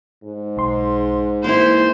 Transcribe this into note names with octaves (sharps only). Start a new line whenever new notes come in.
G#2
B1 C6
E3 A#3 E4 C5